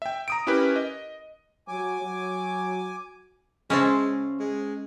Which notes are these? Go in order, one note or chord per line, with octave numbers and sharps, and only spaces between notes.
E5 G5
A#5 D#6 D7
C#4 E4 G4 A#4 B4
D#5
F#3 G#5 D6
F#3
C#3 G#3 C#4 C5 E5 A5
G#3